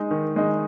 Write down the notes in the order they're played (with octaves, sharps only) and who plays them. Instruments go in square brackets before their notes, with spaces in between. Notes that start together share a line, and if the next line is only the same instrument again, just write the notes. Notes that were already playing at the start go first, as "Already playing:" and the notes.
Already playing: [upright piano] G#3 D#4
D#3
G#3 D#4